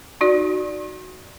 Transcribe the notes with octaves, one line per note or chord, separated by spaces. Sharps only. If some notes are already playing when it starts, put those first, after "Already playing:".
D#4 F#4 D5